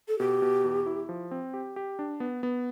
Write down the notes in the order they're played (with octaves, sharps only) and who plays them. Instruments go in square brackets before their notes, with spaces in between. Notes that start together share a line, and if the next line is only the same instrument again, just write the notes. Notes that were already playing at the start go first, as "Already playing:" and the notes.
[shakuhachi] A4
[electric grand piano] B2 [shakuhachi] G4
[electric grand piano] B2
E2
E4
F3
C4
G4
G4
D4
B3
B3